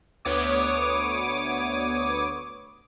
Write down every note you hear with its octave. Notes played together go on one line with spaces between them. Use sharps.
D2 B3 C#5 D6 D#6